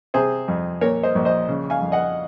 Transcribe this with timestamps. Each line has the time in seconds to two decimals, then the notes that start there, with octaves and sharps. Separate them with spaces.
0.14 C3 G#4 C5
0.48 F2
0.81 A#2 A#4 C#5
1.03 C5 D#5
1.15 A#1
1.25 C5 D#5
1.49 C#3
1.70 F5 G#5
1.81 F2
1.92 D#5 F#5